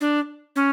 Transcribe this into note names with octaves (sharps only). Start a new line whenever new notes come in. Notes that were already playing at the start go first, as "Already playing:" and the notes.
D4
C#4